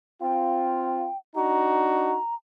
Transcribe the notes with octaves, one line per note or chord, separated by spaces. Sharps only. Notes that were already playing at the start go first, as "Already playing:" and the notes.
C4 F4 G5
D4 D#4 F#4 A#5